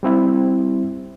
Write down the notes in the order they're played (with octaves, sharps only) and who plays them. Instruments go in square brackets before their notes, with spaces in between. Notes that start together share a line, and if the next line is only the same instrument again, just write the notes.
[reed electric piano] G3 C4 E4